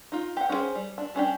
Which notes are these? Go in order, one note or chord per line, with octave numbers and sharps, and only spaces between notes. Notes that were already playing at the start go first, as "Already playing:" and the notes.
D#4 F4
G4 F#5
C#4 D#4 F4 G#4 C5
G3
D4
G3 C#4 D4 G4